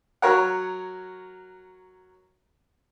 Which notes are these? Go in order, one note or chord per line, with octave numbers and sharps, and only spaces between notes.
F#3 A#4 C#5 F#5